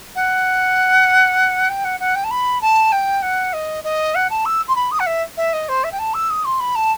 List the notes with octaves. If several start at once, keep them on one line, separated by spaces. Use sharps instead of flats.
F#5
G5
F#5
F#5
G5
A5
B5
A5
G5
F#5
D#5
D#5
F#5
A5
E6
C6
B5
D#6
F#5
E5
E5
D#5
C5
E5
G5
A5
E6
D#6
C6
B5
A5